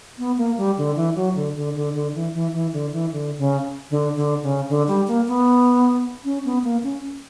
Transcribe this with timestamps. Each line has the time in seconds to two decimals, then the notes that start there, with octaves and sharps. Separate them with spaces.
0.18 B3
0.38 A#3
0.57 G3
0.78 D3
0.96 E3
1.16 F#3
1.35 D3
1.56 D3
1.76 D3
1.94 D3
2.15 E3
2.34 E3
2.54 E3
2.73 D3
2.93 E3
3.12 D3
3.38 C#3
3.91 D3
4.16 D3
4.43 C#3
4.69 D3
4.88 G3
5.08 A#3
5.28 B3
6.25 C#4
6.45 B3
6.64 A#3
6.83 C#4